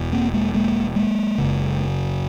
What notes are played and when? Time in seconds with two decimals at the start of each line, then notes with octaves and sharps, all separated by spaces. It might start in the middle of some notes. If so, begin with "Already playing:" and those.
Already playing: E1 E2 B2
0.13 A#3 C4
0.33 G#3 A#3
0.54 G#3 A#3
0.96 G#3 A#3
1.38 F#1 F#2 C#3